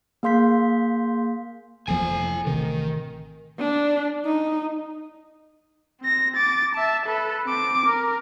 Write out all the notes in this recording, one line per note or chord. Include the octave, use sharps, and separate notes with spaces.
A#3 G#4 F5 C6 G6 B6
F#1 E2 F3 A4 G#5
F1
A1 C3 D#3
D4
D#4
C4 A#6
D6 A6
E5 A5
A4 B4
C4 D6
A#4